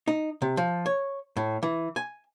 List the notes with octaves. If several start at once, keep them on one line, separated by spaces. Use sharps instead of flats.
D#4
C3
F3
C#5
A2
E3
G#5